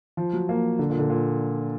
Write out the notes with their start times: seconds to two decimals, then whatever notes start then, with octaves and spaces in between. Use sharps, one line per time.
0.17 F3
0.33 F#3
0.49 A#3
0.79 D3
0.90 A#2
0.99 D3
1.10 A#2